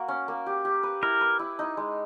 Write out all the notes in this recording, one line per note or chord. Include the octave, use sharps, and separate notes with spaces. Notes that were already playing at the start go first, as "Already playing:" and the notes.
Already playing: A#3 F#4
C#4
A#3
G4
G4
B4
E4 A#4
B4
E4
D#4
G#3